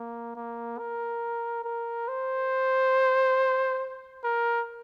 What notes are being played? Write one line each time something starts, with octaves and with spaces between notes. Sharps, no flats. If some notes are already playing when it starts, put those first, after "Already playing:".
Already playing: A#3
A#3
A#4
A#4
C5
A#4